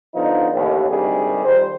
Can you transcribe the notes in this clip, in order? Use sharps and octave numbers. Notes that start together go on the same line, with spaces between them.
D3 F3 B3 D#4
A1 D#2
G#1 D2 C3 D#3 G3 G#4
F2 D#3 G3 C5